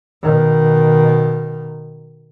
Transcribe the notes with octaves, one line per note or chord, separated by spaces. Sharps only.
B2 D#3